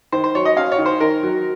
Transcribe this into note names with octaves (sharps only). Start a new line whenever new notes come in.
D#3 C5
C5
F#3 C#5
D#5
C#4 F5
C#5
D#3
C5
D#3 A#4
F#3